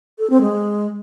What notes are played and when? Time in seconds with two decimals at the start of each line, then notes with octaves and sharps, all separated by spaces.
0.19 A4
0.30 C4
0.41 G#3